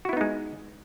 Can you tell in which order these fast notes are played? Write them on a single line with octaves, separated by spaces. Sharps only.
F#4 E4 B3 D#4 G#3